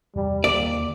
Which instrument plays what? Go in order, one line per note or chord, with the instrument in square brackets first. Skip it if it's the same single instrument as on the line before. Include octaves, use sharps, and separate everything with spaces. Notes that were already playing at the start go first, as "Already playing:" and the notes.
[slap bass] E2 C3 [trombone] G3
[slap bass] D#2 D3 D#3 [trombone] A#3 [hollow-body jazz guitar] D5